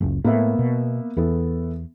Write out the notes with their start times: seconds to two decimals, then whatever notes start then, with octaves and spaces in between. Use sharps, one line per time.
0.01 F#1 C#2
0.24 A2 A#3 B3 E5
0.59 B2
1.17 E2 E3 B3 A4